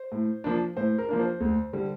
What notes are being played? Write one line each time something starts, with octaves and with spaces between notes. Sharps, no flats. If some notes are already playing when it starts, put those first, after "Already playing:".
Already playing: C5
A2
F3 A#3 D4
A2 C5
A#4
F3 A#3 D4
C5
D2
D3 G3